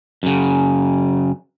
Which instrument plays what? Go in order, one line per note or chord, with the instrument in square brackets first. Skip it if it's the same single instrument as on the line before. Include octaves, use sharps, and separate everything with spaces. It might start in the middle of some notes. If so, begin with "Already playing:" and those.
[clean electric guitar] F#2 C#3